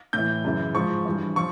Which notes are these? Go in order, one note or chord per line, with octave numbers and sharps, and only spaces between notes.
A2 E3 G6
F#2 C#3 E3
G#2 F3 C#6
G2 E3
F3 C#6